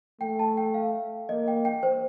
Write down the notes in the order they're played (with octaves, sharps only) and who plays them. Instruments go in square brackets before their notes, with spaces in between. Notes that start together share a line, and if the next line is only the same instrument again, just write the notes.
[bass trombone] A3 [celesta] G5
[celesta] A5
G5
F5
[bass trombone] A#3 [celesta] D#5
[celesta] G5
G5
C5